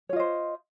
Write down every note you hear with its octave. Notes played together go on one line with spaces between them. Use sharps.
F4 C5 C#5 D#5